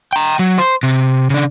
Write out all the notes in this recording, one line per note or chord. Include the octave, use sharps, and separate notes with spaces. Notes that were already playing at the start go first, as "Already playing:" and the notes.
G5 A#5
F#3
C5
C3
C#3 D4